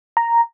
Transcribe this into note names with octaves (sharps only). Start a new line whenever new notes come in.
A#5